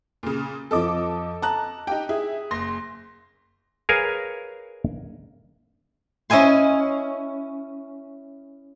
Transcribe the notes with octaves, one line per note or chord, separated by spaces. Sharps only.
A#2 C#3
F2 F3 A4 D#5 D6
A5 A#5 F#6
D#4 G4 G5
E4 G#4
F#1 C6 A#6
G#4 A#4 B4 C#5 F5 G#5
C#4 E4 D#5 G#5 C6